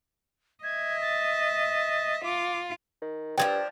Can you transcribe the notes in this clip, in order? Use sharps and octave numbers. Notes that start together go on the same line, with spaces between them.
D#5 E5 G#6
A6
F4 D6
D#3
G2 F3 F#3 D4 G5 G#6